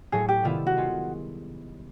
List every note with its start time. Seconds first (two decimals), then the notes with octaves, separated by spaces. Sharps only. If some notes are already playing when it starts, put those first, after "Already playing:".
0.12 A2 F#3 A3 C#4 G#4
0.29 G4
0.43 C3 D#3 G3 B3 E4 F4
0.67 F#4
0.77 G#3 C#4 F4